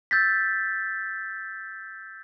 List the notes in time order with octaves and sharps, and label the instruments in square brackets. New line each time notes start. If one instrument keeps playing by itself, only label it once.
[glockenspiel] E6 G6 A6 B6